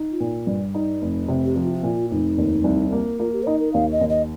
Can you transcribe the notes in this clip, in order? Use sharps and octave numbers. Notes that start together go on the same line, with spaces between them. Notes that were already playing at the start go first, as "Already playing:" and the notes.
Already playing: D#4
F4
A#2
G2
D#4
F1
C3
G4
F3 F4
F4
A#2
F4
F1 D#4
D#2
C2
A#3
A#3 F4
G4
C5
D#4 D#5
A#4
D#2 F5
D#5
D#2
D#5